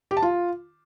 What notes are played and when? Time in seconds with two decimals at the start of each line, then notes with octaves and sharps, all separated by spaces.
0.11 G4
0.17 A5
0.22 F4